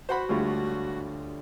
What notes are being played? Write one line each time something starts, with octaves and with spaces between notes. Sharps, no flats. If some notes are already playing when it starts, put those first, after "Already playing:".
F#4 C5 F#5 B5
D2 G3 G#3 F4 C#5